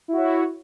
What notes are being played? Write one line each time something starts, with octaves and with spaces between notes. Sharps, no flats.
E4 F#4 C#5